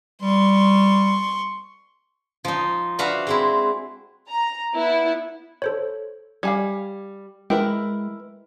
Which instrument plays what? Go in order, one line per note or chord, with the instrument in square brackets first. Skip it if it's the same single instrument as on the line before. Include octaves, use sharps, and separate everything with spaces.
[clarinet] G3 [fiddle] C6 C#6
[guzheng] F3 D#4
D4 F#4 B4 E5 F5
G#3 C4 E4
[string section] A#5
B3 E4
[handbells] A4 C5 C#5
[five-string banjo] G3 [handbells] F5 G#5 G#6
[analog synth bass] G#3 [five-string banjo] E4 A#4 B4 [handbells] G5